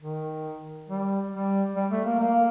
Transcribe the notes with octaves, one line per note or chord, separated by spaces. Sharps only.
D#3
G3
G3
G3
A3
A#3
A#3